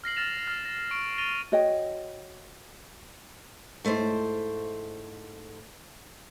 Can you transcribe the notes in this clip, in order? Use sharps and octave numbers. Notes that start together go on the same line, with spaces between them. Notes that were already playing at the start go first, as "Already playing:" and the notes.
F6 A#6 C7 F#7
F6 A6 A#6 E7 F7
F6
A6 A#6
C#6 D7
C#6 A6 A#6 D#7 F7 G7
F#4 C#5 D#5 G5
G#2 A3 E4 C5